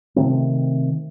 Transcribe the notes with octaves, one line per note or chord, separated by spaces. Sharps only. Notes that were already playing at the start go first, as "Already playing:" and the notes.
C3 D#3 A3 C4